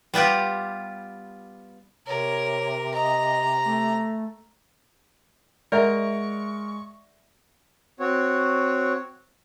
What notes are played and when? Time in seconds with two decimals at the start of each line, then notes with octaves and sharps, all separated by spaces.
0.14 G3 B3 F4 G4
2.07 C3 A#4 C#5
2.94 D#5 A#5
3.65 A3
5.72 G#3 A#4 D5 E5 F#5 A#5 C#6
8.00 C4 F#4 C#5